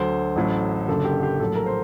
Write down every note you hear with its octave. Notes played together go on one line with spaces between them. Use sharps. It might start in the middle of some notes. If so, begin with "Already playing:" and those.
Already playing: D2 D3 F#3 C5
A1 A2 F#3
F#1 F#2 D3 F#3 A4
G4
G4
A#1 A2 F#3 A4
A#4
C5